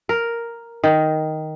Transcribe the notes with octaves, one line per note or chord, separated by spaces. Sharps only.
A#4
D#3